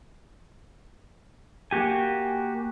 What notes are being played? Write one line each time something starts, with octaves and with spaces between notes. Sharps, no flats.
A#3 F#4 G4 G#5